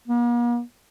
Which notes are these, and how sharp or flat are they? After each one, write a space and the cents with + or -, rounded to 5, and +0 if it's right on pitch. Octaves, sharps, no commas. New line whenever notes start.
A#3 +45